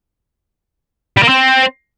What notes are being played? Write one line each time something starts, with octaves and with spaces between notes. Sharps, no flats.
G3
A#3
C4